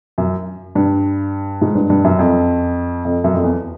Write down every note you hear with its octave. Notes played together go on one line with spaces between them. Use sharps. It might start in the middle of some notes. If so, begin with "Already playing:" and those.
F#2
G2
G#2
G2
G2
F#2
F2
F2
F#2
F2
E2